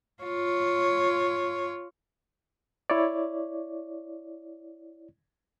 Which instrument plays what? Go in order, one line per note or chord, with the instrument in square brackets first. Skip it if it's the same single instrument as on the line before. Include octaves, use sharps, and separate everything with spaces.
[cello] F4 C#5
[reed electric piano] E4 C#5 D5